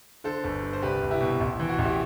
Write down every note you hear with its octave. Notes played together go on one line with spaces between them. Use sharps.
D3 A4 C5
G1
G2
C5
C2 G4 B4
C2
E4 G4
B2
A1 E4
E3
F#4
A1
E4 G4